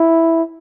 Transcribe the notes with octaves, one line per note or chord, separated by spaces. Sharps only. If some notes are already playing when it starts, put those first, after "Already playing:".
Already playing: E4